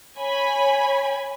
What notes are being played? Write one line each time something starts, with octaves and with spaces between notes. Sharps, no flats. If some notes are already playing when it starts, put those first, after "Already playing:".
C#5 G#5 B5